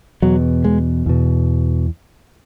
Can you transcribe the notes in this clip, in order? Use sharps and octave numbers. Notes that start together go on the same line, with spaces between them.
E2 B2 F#3
G#3
E2 B2